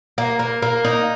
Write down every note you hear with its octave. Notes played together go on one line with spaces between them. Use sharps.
A#3
A#3
A#3
D#4